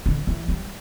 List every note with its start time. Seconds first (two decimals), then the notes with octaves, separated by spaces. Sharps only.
0.06 D3
0.27 E3
0.48 G3